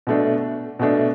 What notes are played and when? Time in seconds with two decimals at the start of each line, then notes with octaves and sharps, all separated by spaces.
0.07 B2 A3 D4
0.79 B2 A3 D4